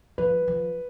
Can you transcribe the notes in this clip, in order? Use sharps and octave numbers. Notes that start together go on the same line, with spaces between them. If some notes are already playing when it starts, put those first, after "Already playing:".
F3 B4
F3